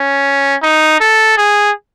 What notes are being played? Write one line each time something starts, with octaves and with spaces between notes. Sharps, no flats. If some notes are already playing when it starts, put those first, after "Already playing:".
Already playing: C#4
D#4
A4
G#4